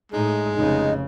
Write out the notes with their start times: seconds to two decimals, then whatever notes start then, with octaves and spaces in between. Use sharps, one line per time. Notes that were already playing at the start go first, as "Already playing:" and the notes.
0.12 A2 G#3 D#4
0.55 F1 C#3 D#4